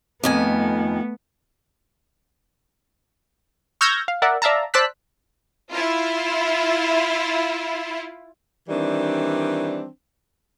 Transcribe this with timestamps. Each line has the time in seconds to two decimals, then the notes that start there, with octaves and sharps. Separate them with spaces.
0.23 F2 D#3 A3 B3 G#5
3.81 C#6 E6 F6 G6 G#6 A#6
4.08 F5
4.22 A#4 D5 E5 F#5
4.42 D5 E5 F5 A5 A#5
4.74 C5 D5 A5 E6 F#6 B6
5.72 E4 F4
8.69 D#3 E3 G3 C4 D4